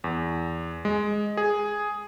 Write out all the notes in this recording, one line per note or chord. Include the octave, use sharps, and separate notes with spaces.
E2
G#3
G#4